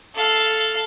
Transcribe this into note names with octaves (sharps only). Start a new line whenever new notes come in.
A4 F5